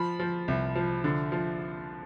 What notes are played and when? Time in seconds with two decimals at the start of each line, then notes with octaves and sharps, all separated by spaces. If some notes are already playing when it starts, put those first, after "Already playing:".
Already playing: F3 B5
0.20 F3
0.48 C2
0.75 F3
1.04 D3
1.32 F3